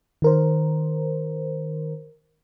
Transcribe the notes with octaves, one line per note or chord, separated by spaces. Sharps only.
D#3 A#4 C5